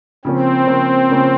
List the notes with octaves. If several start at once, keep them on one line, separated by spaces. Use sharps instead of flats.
C#3 F3 A#3 C4 C#4
C#3 F3 A#3 C#4
C#3 F3 A#3 C#4